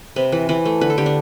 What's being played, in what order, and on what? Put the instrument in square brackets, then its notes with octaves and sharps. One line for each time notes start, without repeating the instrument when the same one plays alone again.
[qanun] C3 B4
E3 B4
E3 B4
A3
D3 B4
A4
D3 G4
D4